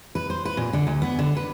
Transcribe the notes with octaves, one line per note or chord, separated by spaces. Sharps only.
B4
C5
B4
A#2
D3
D2
B3
D3
B4